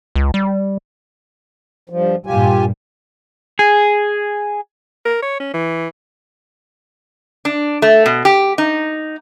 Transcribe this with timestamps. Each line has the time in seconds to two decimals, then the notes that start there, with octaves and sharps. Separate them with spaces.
0.16 C#2
0.34 G3
1.90 G2 F3
2.26 G2 A#2 G3 F4 G4 G#5
3.59 G#4
5.06 A#4
5.22 C#5
5.40 C#4
5.54 E3
7.45 D4
7.82 A3
8.06 B2
8.25 G4
8.58 D#4